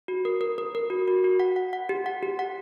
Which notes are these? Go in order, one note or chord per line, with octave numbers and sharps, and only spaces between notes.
F#4
A#4
A#4
A#4
A#4
F#4
F#4
F#4
F#5
F#5
F#5
G4
F#5
G4
F#5